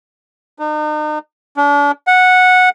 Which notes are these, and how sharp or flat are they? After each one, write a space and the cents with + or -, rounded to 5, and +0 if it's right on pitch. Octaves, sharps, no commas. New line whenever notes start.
D#4 -40
D4 -35
F#5 -10